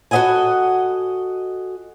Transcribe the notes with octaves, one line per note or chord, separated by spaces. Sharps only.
F#4 A4 C5 D#5 F#5 G#5